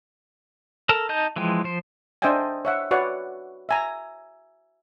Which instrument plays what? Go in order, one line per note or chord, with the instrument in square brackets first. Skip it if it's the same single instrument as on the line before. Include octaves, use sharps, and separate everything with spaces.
[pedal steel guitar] A4 A#4 A5
D#4 D#5 A5 G6
E3 F3 G#3 G5
F3 C5
[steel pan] D4 C5 D#5 E5 G5 G#5
C#5 E5 F#5
F#4 B4 C#5 D5 F#5
E5 G#5 A#5